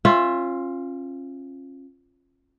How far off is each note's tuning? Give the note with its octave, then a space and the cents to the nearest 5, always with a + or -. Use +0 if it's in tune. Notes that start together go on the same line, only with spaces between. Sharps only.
C#4 -35 F4 +0 E5 +0